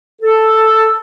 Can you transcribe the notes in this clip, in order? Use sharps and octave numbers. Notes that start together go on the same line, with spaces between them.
A4